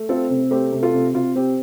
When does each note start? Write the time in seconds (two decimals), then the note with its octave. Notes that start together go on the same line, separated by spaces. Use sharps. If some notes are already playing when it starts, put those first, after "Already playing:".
Already playing: A3
0.09 C4 F4 A4
0.30 C3
0.51 A3 G4 C5
0.72 C3
0.83 F4 A4
0.94 C3
1.14 C3 F4
1.36 C4 G4